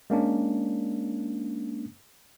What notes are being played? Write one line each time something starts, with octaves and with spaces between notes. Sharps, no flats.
G#3 A#3 C#4 D4